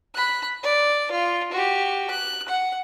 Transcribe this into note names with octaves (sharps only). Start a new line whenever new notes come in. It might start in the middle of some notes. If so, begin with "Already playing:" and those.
B5 F#6
D5
F4
F#4 G4
F#6
F#5